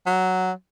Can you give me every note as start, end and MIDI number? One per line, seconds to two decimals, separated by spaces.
0.06 0.52 54